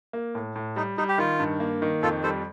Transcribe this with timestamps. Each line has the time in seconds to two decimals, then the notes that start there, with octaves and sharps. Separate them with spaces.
0.13 A#3
0.35 A2
0.56 A2
0.76 G3 D#4
0.97 G3 D#4
1.08 G4
1.18 D#3 F4
1.40 G2
1.60 A#3
1.82 D#3
2.02 F2 F4 A4
2.23 G3 A4 C5